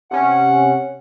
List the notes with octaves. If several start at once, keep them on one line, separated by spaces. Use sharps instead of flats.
C3 C#4 F#5